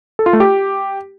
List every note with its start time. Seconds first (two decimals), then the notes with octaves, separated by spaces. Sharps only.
0.19 A4
0.26 F4
0.33 A3
0.40 G4